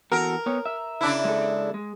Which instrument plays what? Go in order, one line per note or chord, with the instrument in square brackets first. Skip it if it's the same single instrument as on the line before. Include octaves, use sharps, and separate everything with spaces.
[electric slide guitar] E2 F#4 A4 [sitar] A#4
[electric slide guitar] B3 C#5
E5
[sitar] C#3 D4 E4
[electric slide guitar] G#3 A4
G#3